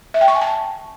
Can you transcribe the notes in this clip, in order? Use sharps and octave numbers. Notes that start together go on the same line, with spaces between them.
E5
G5
C#6
G#5
A5